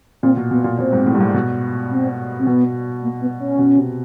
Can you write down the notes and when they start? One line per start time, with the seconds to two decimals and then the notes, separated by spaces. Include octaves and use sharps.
0.23 A#2 C4
0.37 B2
0.51 B2 B3
0.64 A#2
0.78 A#2 C4
0.93 G#2
1.06 A2
1.15 G2
1.20 G#2
1.34 B2
1.91 C4
2.39 C4
2.47 B2 B3
3.03 A#3
3.21 B3
3.40 C#4
3.59 B2
3.77 C3